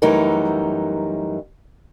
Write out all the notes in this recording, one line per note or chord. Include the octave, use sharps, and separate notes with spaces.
F#2 E3 G3 A3 D#4 A#4